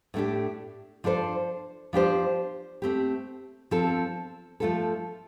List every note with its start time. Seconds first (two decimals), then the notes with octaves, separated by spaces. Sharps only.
0.14 A2 A3 D4 G4
1.04 F3 D4 A4 C5
1.93 F3 D4 G4 C5
2.82 A3 C4 G4
3.71 F3 C4 A4
4.60 F3 A3 F4 A4